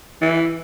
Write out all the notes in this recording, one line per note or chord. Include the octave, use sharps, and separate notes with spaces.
E3